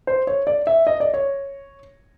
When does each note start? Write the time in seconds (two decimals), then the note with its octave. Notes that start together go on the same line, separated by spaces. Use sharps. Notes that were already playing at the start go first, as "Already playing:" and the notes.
0.07 C5
0.27 C#5
0.47 D5
0.67 E5
0.87 D#5
1.00 D5
1.14 C#5